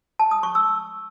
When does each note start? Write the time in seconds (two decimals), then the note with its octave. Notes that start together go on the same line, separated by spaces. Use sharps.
0.19 A5
0.31 D#6
0.43 C#6
0.55 E6